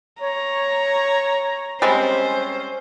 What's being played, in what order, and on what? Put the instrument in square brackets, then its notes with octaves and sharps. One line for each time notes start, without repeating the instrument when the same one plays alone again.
[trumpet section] C#5 [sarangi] A#5
[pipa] G3 G#3 C4 [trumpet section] C#4 [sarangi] C5